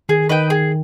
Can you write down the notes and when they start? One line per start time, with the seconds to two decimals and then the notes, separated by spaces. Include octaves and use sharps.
0.09 D#3 G#4
0.29 D#3 B4 D#5 G5
0.50 G#4